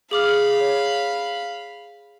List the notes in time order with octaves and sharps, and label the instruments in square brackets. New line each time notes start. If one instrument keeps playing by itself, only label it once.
[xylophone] G#4 D6 F6 [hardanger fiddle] F5 B5
[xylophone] C#5